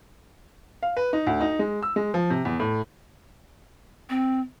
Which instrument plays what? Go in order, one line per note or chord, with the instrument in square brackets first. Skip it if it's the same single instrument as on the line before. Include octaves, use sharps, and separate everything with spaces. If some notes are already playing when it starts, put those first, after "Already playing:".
[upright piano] F5
B4
D#4
D2
D#4
G#3
E6
G#3
F3
C3
E2
A2
[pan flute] C4